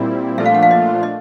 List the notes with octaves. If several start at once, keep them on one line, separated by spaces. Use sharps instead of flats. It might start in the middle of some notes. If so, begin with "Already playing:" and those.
Already playing: A#2 G3 C4 E4
A#2 F3 A3 D4 F4 E5
F5
F#5
F5
D#5
D#5